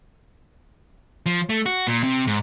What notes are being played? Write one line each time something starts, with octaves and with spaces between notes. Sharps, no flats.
F3
A3
F#4
A#2
C3
G#2